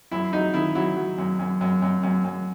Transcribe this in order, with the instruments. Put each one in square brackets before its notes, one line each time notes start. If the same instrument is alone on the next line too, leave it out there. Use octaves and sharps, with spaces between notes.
[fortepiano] F#2 E4
F#3 D#4
D#3 E4
F#3 E4
F#3
F#2
F#2
F#2
F#2
F#2
F#2